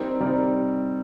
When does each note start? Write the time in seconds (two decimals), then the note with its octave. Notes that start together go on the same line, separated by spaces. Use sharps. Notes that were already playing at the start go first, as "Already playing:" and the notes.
Already playing: G3 C4 D#4 A#4 D5
0.21 G3 C4 D#4 A#4 D5